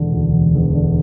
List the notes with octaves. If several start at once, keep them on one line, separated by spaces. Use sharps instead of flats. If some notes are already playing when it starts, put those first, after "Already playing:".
Already playing: E1 D3
D2
E1
E1
D3